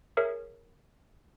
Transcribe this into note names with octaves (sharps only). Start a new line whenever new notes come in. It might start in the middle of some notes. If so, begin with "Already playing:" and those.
G#4 A#4 C#5 E5